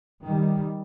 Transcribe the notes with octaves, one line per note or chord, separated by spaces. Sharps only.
D#3 G3